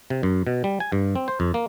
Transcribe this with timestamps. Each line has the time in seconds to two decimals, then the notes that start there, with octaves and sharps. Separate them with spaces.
0.10 C3
0.23 F#2
0.47 B2
0.64 G3
0.80 G#5
0.92 G2
1.16 C4
1.28 C5
1.40 F2
1.54 A#3